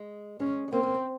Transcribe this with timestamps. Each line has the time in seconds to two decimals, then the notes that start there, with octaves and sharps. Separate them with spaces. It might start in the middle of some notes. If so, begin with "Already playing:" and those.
Already playing: G#3
0.40 G#3 C#4
0.68 G#3
0.72 A#3 C4
0.83 A#3
0.94 C4